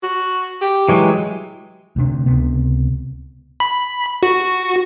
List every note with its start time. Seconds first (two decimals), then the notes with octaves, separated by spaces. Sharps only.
0.03 F#4
0.61 G4
0.89 E3 F#3 G#3
1.96 D2 C3 D4
2.26 C#2 C3 B3
3.60 B5
4.23 F#4